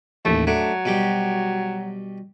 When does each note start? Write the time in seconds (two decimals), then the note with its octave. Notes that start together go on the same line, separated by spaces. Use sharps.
0.25 A1 D#2 A3
0.47 F#3 A3 D4
0.85 B2 G3 G4